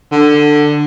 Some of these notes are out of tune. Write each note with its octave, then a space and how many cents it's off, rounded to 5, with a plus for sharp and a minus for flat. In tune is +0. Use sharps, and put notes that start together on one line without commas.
D3 +15